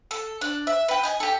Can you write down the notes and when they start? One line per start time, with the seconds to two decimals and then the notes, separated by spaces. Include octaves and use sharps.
0.11 A4
0.41 D4
0.67 E5
0.88 B4 G5
1.04 D#5 G#5
1.20 G4 A4